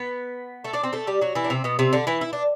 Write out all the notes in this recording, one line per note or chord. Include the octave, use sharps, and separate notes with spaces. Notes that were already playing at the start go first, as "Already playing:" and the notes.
Already playing: B3 B4
A3 A4
D4 D5
C4 C5
A3 A4
G3 G4
F#3 F#4
E3 E4
D4
C3 C4
B2 B3
C3 C4
D3 D4
E3 E4
E4
D4